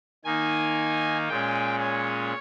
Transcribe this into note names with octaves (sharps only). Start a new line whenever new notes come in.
D#3 A#3 D#4 G#5
A#2 G#3 C#4 G5
C#5